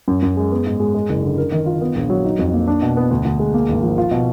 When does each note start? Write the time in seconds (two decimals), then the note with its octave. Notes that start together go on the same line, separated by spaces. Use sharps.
0.08 F#2
0.22 F#2
0.37 G#3
0.52 B3
0.66 G#2
0.80 G#3
0.94 G#3
1.09 F#1
1.23 D3
1.38 A#4
1.52 D#3
1.66 F4
1.81 B3
1.95 A#1
2.10 F#3
2.25 D#4
2.39 F2
2.53 A#3
2.68 D4
2.82 B2
2.97 B3
3.11 D2
3.25 D2
3.40 G#3
3.54 A#3
3.68 G#1
3.82 F3
3.98 F4
4.11 B2